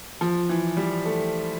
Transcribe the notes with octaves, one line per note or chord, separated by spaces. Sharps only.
F3
E3
G3
A3